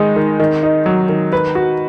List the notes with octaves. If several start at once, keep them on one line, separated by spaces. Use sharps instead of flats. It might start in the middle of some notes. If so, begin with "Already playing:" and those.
Already playing: D#3 G#3 D#4
D#3
D#3
D#4
F#3
D#3
B4
F#4